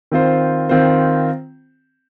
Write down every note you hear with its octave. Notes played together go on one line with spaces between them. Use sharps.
D#3 C4 F4 C5
D#3 C4 F4 C5